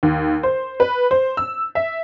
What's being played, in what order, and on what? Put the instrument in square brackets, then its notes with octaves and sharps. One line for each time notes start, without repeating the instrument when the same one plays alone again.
[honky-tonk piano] D#2
C5
B4
C5
E6
E5